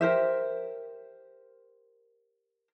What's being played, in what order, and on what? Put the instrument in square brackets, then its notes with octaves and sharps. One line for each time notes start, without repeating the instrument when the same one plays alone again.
[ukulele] G4 A#4 C5 E5